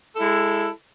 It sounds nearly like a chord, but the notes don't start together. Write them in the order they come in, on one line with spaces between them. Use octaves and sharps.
A4 E4 G#3